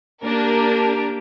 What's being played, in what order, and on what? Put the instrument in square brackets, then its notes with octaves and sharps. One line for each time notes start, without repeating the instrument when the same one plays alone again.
[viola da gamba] A#3 G4 [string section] D4 A#4